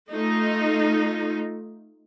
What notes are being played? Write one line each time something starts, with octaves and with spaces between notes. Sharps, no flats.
A3 D#4 F4